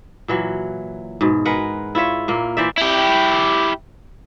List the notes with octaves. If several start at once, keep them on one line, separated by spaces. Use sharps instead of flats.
A#2 E3 F#3
G#2 B2
G#3 A#4 B4 F#5
E4 F4 C#5 E5
A#2 A#3
E3 C5 D5 E5
E4 G4